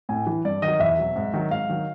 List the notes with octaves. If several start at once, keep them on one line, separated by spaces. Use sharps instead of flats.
A2 G#5
E3
G2 D5
D#3 F#3 D#5
E2 E5
B2 F#3
G#2
D#3 F#3
G#2 F5
D#3 F#3